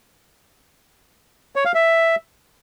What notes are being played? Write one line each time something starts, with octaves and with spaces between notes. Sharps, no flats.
C#5
F5
E5